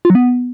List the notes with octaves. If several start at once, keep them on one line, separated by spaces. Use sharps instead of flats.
F4
F#3
B3